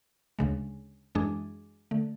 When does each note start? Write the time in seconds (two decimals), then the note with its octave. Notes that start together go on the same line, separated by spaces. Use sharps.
0.39 D2 C#3 G#3
1.15 F#2 E3 G#3 D4 G#4
1.91 D3 A3